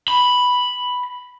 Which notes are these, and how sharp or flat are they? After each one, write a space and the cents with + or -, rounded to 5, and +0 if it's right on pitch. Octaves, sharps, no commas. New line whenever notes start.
B5 +0